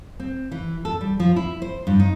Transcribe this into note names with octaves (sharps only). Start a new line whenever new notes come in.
C4
E3
A4
G3
F3
E4
C5
G2
D#4